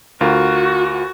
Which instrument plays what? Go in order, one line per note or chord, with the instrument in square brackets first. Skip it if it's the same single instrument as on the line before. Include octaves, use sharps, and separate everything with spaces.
[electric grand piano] D2 F4 A#4 [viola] F#4